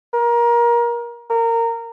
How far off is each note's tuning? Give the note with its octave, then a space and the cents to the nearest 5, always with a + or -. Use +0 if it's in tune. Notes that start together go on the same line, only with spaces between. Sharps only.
A#4 +25
A#4 -20